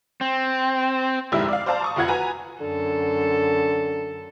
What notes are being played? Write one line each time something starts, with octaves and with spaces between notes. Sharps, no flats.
C4
F1 C2 G#2 G3 E4 E6
D5 F5
C5 D5 F5 A5 A#5
A5 C#6 D#6
F1 F2 F4 F#5 G#6
F#4 B4 G#5 A#5
F#2 D3 A4